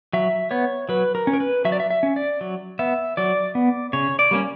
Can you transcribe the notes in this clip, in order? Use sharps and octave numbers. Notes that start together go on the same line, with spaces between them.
F#3 E5
B3 C#5
F#3 B4
A#4
C#4
A#4
B4
F#3 E5
D5
E5
E5
C#4
D5
F#3
B3 E5
F#3 D5
B3
C#3 C#5
D5
G3 A#3 C#4